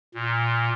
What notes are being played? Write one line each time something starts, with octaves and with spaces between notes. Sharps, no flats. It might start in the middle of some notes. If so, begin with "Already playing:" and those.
A#2